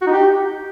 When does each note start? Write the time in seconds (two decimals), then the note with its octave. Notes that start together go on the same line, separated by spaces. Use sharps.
0.02 F#4
0.07 D#4
0.12 G4